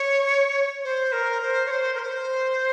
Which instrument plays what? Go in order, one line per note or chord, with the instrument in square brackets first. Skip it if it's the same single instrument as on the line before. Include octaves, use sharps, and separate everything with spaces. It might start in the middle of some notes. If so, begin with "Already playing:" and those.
Already playing: [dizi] C#5
C5
A#4
C5
C#5
C5
A#4
C5